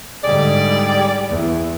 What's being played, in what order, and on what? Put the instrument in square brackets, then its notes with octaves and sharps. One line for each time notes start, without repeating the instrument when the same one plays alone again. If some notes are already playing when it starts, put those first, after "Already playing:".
[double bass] G#2 D3 [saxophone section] G3 G#4 D5
[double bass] E2